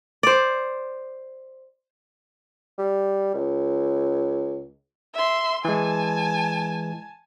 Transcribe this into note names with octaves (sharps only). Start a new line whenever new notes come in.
C5 D5
G3
C#2
E5 C6
E3 G#3 G#5 A5